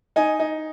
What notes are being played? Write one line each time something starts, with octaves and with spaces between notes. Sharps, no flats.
D#4 G#5
D#4